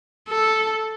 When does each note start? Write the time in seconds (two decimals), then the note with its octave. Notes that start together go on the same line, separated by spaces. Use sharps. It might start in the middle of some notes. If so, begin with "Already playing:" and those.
0.29 A4